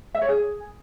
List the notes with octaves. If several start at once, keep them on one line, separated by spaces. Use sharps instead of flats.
E5
C#5
G#4